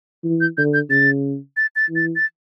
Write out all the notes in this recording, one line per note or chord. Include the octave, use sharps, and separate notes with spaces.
E3
G6
D3 G6
G6
C#3 A6
A6
A6
E3
A6
A6